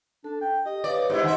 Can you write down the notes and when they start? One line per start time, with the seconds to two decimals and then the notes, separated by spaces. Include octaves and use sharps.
0.24 D4 A4
0.41 G5
0.66 G4 D#5
0.84 B4 C#5 D5 F5
1.10 G#2 E4 G4 C5
1.23 D#3 E5 F#5 G#5 C6